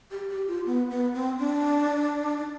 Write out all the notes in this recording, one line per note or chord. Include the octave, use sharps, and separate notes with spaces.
G4
G4
F4
B3
B3
C4
D4